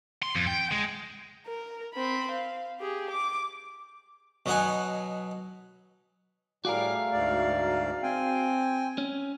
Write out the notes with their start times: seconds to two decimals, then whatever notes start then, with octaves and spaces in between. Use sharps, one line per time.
0.23 C6
0.35 F2
0.47 G5
0.72 G#3
1.47 A#4
1.94 C4 B5
2.31 F5
2.80 G4 G#4
3.11 D6
4.46 B2 F#3 D#4 F#5 G#5
6.65 A2 G3 A3 F#4 G#4 A#4 F5 D6
7.12 D2 G#2 D5
8.03 C4 G5 G#5
8.98 C#4